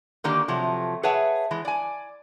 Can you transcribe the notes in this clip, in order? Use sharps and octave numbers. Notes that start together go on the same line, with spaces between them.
D3 D#3 A#3 D#4 G4 D5
C3 F3 F#3 A3
G#4 B4 C#5 E5 F#5 A5
E3 G#3
D5 G#5